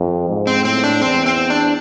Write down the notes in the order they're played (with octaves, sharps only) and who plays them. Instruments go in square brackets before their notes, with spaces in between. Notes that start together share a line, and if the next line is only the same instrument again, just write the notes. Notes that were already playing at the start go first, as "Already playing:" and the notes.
Already playing: [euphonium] F2
G#2
[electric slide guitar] C4
[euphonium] A2 [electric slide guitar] C4
[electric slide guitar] D4
[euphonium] E2 [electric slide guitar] C4
[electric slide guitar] C4
D4